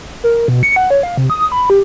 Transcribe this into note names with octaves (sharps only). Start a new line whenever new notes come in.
A#4
B2
C#7
F#5
C#5
F5
C3
D#6
B5
G4